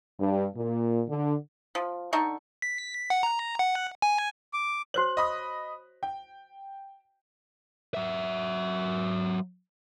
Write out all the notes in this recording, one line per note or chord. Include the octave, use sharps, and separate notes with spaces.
G2
A#2
D3
F3
D3 D#4 A4 C#6
B6
F#5
A#5
F#5
G#5
D6
F#4 C5 C#5 F#6 F#7
D#5 B5 D#6
G5
F#3 E5